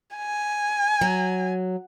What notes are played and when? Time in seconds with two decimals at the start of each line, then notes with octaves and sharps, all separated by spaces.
0.17 G#5
1.01 F#3